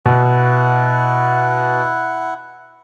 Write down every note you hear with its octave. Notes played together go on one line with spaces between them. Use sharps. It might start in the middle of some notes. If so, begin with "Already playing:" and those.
B2 E4 F#5